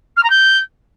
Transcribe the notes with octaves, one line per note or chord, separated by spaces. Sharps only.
F6
A#5
G6